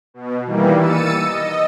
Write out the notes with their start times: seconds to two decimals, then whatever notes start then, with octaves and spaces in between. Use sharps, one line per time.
0.14 B2
0.45 D#3 E3 G3 A#3
0.79 E6 A6 C#7 D#7
1.21 D#5